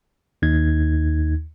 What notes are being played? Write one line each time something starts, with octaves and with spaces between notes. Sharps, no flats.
D#2 D#4 G#6